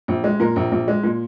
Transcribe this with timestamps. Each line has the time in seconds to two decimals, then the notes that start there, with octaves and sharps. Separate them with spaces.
0.08 A#1
0.24 G#3
0.40 A#2 A#4
0.56 A#1
0.72 A#1
0.88 G#3
1.04 A#2